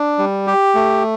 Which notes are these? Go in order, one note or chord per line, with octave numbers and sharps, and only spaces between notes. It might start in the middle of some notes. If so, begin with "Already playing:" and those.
Already playing: D4
G3
G4
A3